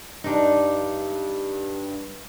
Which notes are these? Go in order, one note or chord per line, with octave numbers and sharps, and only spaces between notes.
G2 D4 D#4